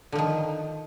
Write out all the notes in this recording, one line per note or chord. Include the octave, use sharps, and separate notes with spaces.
D3 D#3 F3